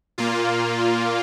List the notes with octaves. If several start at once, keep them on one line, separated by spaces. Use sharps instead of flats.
A#2 A#3 F4